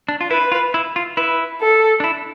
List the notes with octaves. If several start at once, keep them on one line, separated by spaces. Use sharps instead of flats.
D4
F4
E4 B4
F4
E4
F4
E4 B4
A4
D4
E4